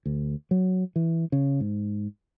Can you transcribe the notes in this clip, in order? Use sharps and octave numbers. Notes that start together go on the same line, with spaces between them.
D2
F#3
E3
C#3
G#2